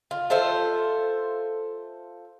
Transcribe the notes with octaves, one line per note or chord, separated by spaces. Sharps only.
F4
F4 A4 C5 E5